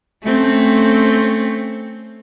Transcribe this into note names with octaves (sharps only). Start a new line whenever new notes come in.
A3 C4 C#4